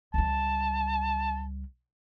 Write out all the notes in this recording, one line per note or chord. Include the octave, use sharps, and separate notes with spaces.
C#2 G3 A5